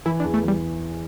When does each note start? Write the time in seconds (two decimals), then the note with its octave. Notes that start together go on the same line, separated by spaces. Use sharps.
0.06 E3 E4
0.20 D4
0.24 E2
0.34 A3
0.44 E3 G3